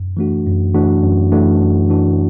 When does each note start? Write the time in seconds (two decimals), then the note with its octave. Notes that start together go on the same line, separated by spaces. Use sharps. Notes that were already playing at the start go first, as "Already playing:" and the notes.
Already playing: F#2
0.17 E3 A3 D4 F#4
0.46 F#2
0.74 E3 A3 D4 F#4
1.03 F#2
1.32 E3 A3 D4 F#4
1.61 F#2
1.90 E3 A3 D4 F#4